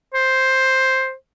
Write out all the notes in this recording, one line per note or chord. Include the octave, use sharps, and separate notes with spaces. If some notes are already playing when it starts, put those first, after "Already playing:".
C5